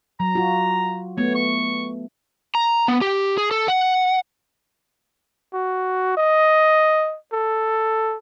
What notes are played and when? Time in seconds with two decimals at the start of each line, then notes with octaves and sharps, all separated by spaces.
0.20 F#3 A#5
0.35 F4 F#4
1.18 A3 B3 C#5
1.35 C#6
2.55 A#5
2.88 B3
3.01 G4
3.38 G#4
3.51 A4
3.68 F#5
5.53 F#4
6.17 D#5
7.33 A4